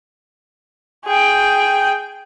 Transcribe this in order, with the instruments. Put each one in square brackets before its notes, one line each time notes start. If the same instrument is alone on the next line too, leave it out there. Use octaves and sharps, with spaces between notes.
[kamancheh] G#4 G5